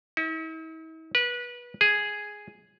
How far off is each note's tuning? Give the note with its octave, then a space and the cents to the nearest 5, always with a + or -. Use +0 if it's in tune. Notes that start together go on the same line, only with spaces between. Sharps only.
E4 -45
B4 -25
G#4 +0